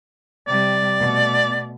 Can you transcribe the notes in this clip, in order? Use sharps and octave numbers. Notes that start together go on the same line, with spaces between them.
C3 G3 D5
B2 A3